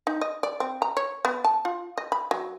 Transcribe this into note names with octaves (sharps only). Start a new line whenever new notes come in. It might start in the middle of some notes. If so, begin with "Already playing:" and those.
D#4
D#5
D5
C4
A#5
C#5
B3
A5
F4
D#5
B5
F#3